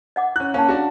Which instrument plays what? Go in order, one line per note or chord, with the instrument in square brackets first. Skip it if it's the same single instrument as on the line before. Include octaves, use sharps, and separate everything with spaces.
[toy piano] D#5 F#5 D6
[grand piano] C#4 F#6 [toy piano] E4
[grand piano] A#3 C#4 [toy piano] F5 A5
[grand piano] D4 F#4